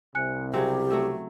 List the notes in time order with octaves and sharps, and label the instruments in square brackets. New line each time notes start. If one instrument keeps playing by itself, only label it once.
[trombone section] C2 C3 [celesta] G#5 F#6 C#7
[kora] C#3 F#3 C4 [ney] G4 [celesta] G5
[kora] F#3 A3 E5